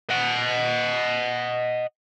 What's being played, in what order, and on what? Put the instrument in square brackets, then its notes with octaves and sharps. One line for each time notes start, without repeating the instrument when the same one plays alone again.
[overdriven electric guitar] D#5 F#5